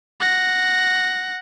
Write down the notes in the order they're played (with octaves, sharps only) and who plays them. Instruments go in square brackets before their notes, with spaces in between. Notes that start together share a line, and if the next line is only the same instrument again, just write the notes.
[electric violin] F#5 A#6